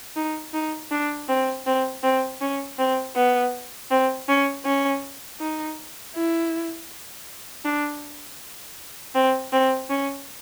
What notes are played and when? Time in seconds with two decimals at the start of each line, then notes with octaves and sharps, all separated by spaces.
0.16 D#4
0.54 D#4
0.91 D4
1.28 C4
1.66 C4
2.03 C4
2.41 C#4
2.79 C4
3.16 B3
3.91 C4
4.29 C#4
4.65 C#4
5.40 D#4
6.15 E4
7.65 D4
9.15 C4
9.52 C4
9.90 C#4